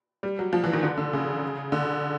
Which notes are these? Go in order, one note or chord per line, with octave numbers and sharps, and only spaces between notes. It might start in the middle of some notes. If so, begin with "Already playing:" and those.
G3
F#3
F3
E3
D#3
D3
D3
C#3
D3